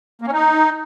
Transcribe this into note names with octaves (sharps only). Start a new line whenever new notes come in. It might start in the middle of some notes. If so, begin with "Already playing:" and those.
A#3
C#4
D#4